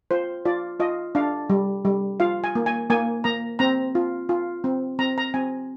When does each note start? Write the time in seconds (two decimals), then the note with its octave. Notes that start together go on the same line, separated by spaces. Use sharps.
0.11 F4 C5
0.45 F4 D5
0.80 F4 D#5
1.15 D4 F5
1.50 G3
1.85 G3
2.20 F4 F5
2.44 G#5
2.55 A#3
2.66 G#5
2.90 A#3 G#5
3.24 A#3 A#5
3.59 C4 A#5
3.95 F4
4.29 F4
4.64 C4
4.99 C4 A#5
5.18 A#5
5.34 C4 G#5